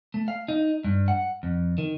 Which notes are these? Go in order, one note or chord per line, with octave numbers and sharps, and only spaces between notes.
A3
F5
D#4
G2
F#5
F2
D#3